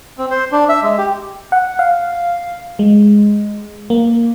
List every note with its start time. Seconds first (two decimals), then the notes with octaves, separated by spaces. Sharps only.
0.18 C4
0.31 C5
0.52 D4
0.69 E5
0.83 G#3
0.98 G4
1.52 F#5
1.79 F5
2.79 G#3
3.90 A#3